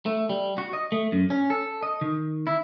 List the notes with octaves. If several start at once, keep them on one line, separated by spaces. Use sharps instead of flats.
A3
G3
F#4
D#5
A3
F#2
C#4
A4
D#5
D#3
E4